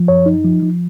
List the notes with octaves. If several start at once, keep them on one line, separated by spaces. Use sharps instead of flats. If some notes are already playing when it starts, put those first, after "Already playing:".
Already playing: F3
F#2 C#5
D#4
F3
F3